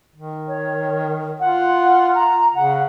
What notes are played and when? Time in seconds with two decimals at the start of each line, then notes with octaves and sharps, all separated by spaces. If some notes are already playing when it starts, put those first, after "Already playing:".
0.16 D#3
0.48 C#5
1.40 F4 F#5
2.15 A#5
2.55 C#3 F#5